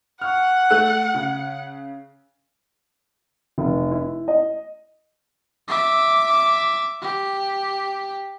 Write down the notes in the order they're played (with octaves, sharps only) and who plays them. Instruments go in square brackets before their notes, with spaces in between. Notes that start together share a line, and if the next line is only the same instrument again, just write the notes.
[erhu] F#5 [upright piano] C#6 F6
[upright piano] A3 A4 F#6
C#3
F1
E4
D#5
[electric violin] E5 D6
G4